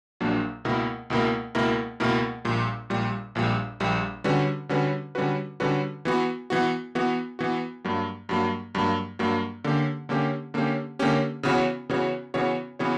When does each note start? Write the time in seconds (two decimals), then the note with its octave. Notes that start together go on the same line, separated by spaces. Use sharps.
0.20 A#1 A#2 F#3 A#3 D4
0.65 C#2 B2 A#3 E4 A#4
1.10 C#2 B2 A#3 E4 A#4
1.55 C#2 B2 A#3 E4 A#4
2.00 C#2 B2 A#3 E4 A#4
2.45 A#1 A#2 G3
2.90 A#1 A#2 G3
3.35 A#1 A#2 G3
3.80 A#1 A#2 G3
4.24 D3 G3 C#4 F#4 B4
4.69 D3 G3 C#4 F#4 B4
5.15 D3 G3 C#4 F#4 B4
5.60 D3 G3 C#4 F#4 B4
6.05 E3 B3 F#4
6.50 E3 B3 F#4
6.95 E3 B3 F#4
7.39 E3 B3 F#4
7.85 G2 F#3 A#3
8.29 G2 F#3 A#3
8.75 G2 F#3 A#3
9.19 G2 F#3 A#3
9.64 D3 A#3 C#4 G4
10.09 D3 A#3 C#4 G4
10.54 D3 A#3 C#4 G4
10.99 D3 A#3 C#4 G4
11.43 C#3 E3 B3 F#4 C#5
11.89 C#3 E3 B3 F#4 C#5
12.34 C#3 E3 B3 F#4 C#5
12.79 C#3 E3 B3 F#4 C#5